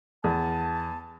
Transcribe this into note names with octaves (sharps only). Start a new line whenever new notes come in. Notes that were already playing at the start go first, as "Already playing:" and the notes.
E2 A5